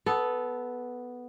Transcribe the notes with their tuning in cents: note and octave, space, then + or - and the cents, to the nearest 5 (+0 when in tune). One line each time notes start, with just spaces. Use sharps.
B3 +0 A4 -15